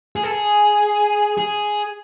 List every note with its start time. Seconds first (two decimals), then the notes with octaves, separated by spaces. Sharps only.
0.16 G#4
0.24 A4
0.31 G#4
1.38 G#4